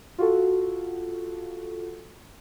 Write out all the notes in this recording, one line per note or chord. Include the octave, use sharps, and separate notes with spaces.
F4 F#4 A4